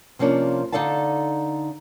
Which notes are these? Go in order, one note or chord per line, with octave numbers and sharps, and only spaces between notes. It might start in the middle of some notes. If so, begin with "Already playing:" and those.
C3 F3 A#3 C#4 D4
D3 D#4 A4 D5 F5 A5